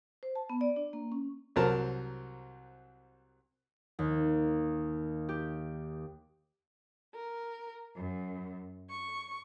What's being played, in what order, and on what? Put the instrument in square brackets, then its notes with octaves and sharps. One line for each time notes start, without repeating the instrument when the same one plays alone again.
[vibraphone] C5
A5
B3
D5
D4
A#3
C#4
[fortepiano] C2 F#3 C4 A#4 A5
[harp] D#2
G4
[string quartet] A#4
F#2
C#6